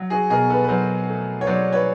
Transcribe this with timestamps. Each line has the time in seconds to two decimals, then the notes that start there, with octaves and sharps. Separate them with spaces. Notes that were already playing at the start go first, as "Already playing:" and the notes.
Already playing: F#3
0.10 F#4 G#4
0.30 B2 G#4 A#4
0.50 A4 B4
0.64 B4
0.69 F#3 A#4 C5
1.09 A3
1.41 C#5
1.47 F#3 C5 D5
1.73 B4 C#5